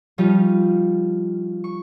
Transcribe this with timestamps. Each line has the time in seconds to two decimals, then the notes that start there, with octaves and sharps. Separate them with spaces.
0.18 F3 G3 C#4 D#4 F4
1.64 C#6